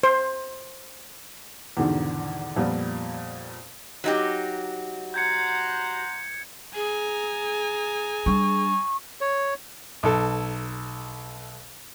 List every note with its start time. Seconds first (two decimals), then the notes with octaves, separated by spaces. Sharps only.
0.03 C5
1.77 E2 G#2 B2 D3 D#3
2.56 F2 A#2 G3 B3
4.04 F#3 D#4 G4
5.14 C5 F#5 A#5 G6 G#6 C#7
6.75 G#4 G#5 A#5
8.26 G3 D4 C#6
9.21 C#5
10.03 B1 A4